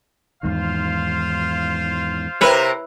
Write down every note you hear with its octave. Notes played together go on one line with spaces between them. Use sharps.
E2 G#2 D#3 F4 C5 F5
C3 C4 E4 A#4 B4 C#5